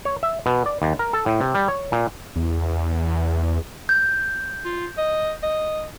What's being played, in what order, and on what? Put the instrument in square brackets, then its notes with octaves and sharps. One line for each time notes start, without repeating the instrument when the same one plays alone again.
[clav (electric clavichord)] C#5
E5
B2
D5
D#2
A#4
A4
A2
C3
G3
C#5
A#2
[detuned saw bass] E2
[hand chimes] G6
[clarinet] F4
D#5
D#5